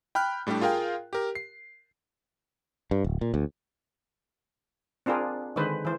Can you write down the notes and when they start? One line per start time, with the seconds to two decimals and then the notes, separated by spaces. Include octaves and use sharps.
0.15 G5 B5 F6 F#6
0.47 A2 G3 A3 D4 G4
0.61 F4 G#4 A#4 F5 G5
1.13 G4 A#4
1.35 C7
2.91 G2
3.04 D1
3.21 A#2
3.34 D2
5.06 C4 D4 F4 G#4 A#4
5.56 D3 D#3 G#3 B4 C5
5.85 E3 C5